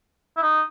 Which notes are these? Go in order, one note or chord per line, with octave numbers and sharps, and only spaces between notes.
E4
D#4